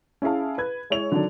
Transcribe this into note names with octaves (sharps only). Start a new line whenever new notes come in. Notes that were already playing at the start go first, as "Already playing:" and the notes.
C#4 E4 G#4 F5 A5
B4 G#6
G#3 E4 C#5 F7
D3 D#3 F#3 D4